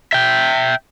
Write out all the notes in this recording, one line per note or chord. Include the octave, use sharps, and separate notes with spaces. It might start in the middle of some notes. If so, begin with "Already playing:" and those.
E5 G5